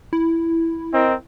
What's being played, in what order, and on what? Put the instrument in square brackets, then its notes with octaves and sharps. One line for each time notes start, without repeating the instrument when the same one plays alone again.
[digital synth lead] E4
[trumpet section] C4 A#4 D#5